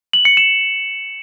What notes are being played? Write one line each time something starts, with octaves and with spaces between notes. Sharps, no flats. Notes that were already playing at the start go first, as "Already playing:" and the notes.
F#7
C#7
E7